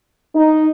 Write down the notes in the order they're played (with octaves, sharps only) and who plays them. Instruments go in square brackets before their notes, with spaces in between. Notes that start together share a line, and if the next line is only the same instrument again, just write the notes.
[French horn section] D#4